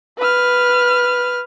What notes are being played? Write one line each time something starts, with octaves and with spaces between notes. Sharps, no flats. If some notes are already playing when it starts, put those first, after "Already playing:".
B4 F6